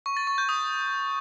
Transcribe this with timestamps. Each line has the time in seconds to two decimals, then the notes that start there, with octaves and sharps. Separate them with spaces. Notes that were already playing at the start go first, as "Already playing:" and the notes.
0.06 C#6
0.17 A6
0.27 C#6
0.38 G6
0.49 D#6